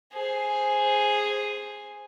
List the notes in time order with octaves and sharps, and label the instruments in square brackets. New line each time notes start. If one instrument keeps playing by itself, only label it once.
[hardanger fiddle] G#4 C5